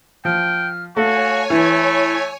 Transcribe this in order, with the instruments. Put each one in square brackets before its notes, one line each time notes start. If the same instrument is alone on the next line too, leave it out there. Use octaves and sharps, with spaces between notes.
[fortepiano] F3 [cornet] G5 [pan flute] F6
[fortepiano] A3 [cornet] F#4 [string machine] C#5 G#5 [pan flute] F5
[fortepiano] E3 [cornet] A3 [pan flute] E4